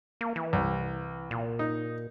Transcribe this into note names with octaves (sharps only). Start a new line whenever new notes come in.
A#3
E3
C2
A#2
D#4